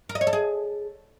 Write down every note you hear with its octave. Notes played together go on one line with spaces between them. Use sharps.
A#4
D#5
C#5
A4
G#4